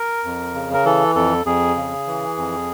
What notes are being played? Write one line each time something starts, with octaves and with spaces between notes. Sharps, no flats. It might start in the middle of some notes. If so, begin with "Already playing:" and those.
Already playing: A#4
F2
C#3
A#4
E3 A4
F2 A4
F2 G#4
C#3
E3
F2